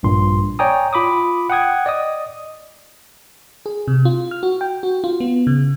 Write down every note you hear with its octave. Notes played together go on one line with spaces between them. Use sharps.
A#1 G2 A#2 C6
C#5 D5 G5 G#5 A#5 D#6
F4 B5 D6 D#6
F#5 G5 D#6 G#6
D5 D#5 D#6
G#4
C3
F4
F6
F#4
G5
F#4
F4
B3
C#3